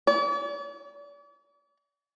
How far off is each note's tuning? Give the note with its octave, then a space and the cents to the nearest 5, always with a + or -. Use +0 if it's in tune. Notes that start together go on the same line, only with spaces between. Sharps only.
D5 -45